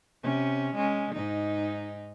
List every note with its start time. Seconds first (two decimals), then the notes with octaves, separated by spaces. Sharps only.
0.23 C3 C#4
0.75 G#3 C#4
1.15 G#2 D#4